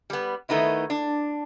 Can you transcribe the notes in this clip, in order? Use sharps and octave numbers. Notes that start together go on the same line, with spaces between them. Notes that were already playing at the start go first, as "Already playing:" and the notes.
G3 B3
D#3 A3 B3 D#4 E4
D4